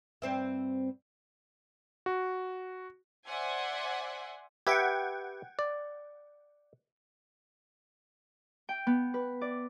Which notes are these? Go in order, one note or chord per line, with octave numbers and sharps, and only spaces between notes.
G2 C4 E5
F#4
C5 D5 E5 F#5 G#5 C6
G4 B4 E5 F#5 G5 G#6
D5
G5
B3
B4
D5